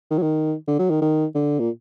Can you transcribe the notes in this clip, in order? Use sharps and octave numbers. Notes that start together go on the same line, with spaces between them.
D#3
F#3
D#3
D3
F#3
D#3
D#3
D3
A#2